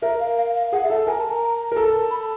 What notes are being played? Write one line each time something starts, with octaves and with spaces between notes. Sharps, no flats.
A#4 E5
F5
F5
F5
G#4 F#5
E5
A4
A#4 G#5
A5
A#5
A#4
A4
B5